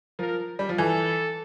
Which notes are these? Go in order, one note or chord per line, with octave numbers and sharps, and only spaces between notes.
F3 A#4
G3
F3
E3 A4